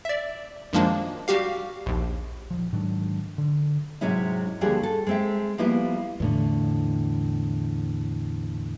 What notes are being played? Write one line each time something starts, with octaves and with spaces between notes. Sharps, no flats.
D5 E5
F#2 D#3 F3 G#3 A#3 D4
G3 F#4 G4 F5
A#1 D#2
D#1 F3
G#2 D#3 F#3 D4
D3
G#2 C3 F#3 G#3 C#4 E4
D#2 D3 F3 G3 F#4 G#4
A4
G#3 C4 E5
F3 G3 A#3 B3 E4
E2 A2 D3